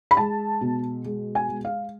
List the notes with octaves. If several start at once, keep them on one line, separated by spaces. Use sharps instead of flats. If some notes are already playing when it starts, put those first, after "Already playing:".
B5
G#3 A5
B2
G#3
G#5
G#3
F5